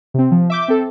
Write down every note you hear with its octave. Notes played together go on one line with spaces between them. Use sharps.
C3 C4
F3
E5 D6 G6
C4 A4